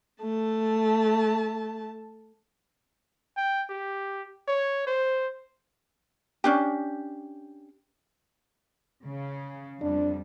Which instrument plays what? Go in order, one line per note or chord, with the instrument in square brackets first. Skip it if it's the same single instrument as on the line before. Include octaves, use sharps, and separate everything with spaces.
[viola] A3 A5
[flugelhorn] G5
G4
C#5
C5
[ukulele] C#4 D4 G4
[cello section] C#3
[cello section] F2 G3 [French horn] D4